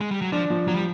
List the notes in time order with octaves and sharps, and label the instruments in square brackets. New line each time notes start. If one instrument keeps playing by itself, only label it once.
[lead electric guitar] G#3
G3
F#3
[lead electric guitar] F3 [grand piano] D4
[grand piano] F3
[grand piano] F3 [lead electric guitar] F#3
[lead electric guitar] G3